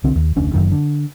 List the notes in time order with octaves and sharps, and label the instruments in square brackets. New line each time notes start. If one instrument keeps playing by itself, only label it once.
[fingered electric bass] C2 D3 C4
D#2
F1 D2 C#4 D4
F#1 C2 F#2 D#3
D3